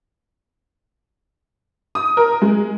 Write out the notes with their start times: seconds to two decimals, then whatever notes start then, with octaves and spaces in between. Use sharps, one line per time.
1.95 D#6
2.17 A#4
2.42 G#3